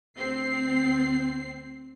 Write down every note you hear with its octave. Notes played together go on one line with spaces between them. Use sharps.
D2 C4 C7